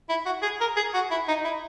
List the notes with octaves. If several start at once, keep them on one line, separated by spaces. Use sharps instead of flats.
E4
F#4
G#4
A#4
G#4
F#4
E4
D#4
E4